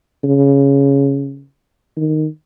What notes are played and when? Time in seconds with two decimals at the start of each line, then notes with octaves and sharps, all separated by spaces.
0.24 C#3
1.97 D#3